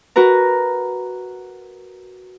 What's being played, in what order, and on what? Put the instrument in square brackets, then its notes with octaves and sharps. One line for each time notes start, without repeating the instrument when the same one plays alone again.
[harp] F#4 A#4 B4 A#5